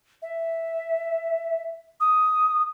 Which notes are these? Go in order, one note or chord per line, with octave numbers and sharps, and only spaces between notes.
E5
D#6